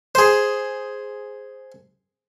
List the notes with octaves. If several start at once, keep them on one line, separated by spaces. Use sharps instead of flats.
G#4 C5